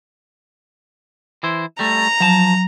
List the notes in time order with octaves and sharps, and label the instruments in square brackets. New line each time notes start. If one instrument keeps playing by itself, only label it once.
[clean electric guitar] E3 E4 C5
[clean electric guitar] G3 A3 [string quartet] A#5
[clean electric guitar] F3 A5 [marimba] F#3